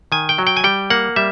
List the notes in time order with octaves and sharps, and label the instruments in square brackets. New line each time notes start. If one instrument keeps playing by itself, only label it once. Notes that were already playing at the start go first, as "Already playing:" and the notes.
[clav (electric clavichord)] D#3 G#5
G5
F#3
G5
G#5
G3 G5
A#3 F#5
G3 E5